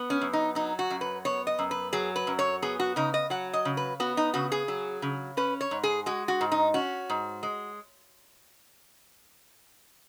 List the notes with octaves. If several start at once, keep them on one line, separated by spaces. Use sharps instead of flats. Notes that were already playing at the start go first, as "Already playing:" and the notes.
Already playing: B3
C#4
F#2
D#4
F#3 D#4
F#4
F#2
B4
B3 C#5
D#5
F#2
B4
F#3 G#4
B4
F#2
C#5
B3 G#4
F#4
C#3 D#4
D#5
F#3 F#5
D#5
C#3
B4
B3 F#4
D#4
C#3 F#4
G#4
F#3
C#3
C#4 B4
C#5
G#2
G#4
G#3 F#4
F#4
G#2
D#4
C#4 F#4
G#2
G#3